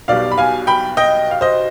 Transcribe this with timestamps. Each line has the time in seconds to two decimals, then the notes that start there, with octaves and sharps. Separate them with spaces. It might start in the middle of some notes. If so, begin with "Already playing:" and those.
0.08 B1 B2 G3 D5 F5
0.31 B5
0.38 F5 G#5
0.67 G5 B5
0.97 D#5 G5
1.31 F5
1.41 C5 D#5